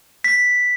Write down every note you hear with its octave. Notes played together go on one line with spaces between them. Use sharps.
B6